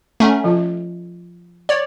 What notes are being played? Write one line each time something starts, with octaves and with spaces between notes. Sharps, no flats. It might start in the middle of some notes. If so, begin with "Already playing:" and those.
A3 C#4 E5 F#5 A#5
F3 F4 A5
C#5 D5